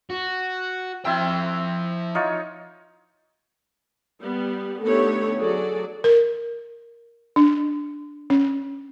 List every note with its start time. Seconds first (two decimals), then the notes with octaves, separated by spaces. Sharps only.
0.10 F#4
1.05 F3 C4 E4 E5 G5
2.15 D#4 F4 C#5
4.20 G3 B3
4.82 D3 A3 B3 D#4 G4 C#5
5.39 F#3 F#4 G#4 A4 D5
6.04 A#4
7.36 D4
8.30 C#4